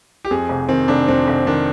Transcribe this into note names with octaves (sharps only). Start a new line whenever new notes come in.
G4
F2 G#4
F1
D#3 C4
F1 D4
F2 C4
F1
D#3 D4